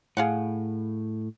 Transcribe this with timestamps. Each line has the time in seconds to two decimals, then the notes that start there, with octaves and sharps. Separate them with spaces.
0.17 A2 G#4 F5 F#5